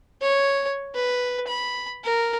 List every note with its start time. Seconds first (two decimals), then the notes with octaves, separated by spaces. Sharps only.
0.22 C#5
0.95 B4
1.48 B5
2.05 A#4